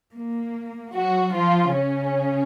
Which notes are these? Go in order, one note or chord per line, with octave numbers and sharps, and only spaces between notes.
A#3
F#3 F#4
F3 F4
C#3 C#4